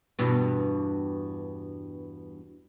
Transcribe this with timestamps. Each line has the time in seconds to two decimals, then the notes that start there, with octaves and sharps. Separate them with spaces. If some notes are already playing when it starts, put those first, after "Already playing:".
0.19 E2 G2 B2